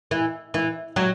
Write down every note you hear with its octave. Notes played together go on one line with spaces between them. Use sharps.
E3
E3
F#3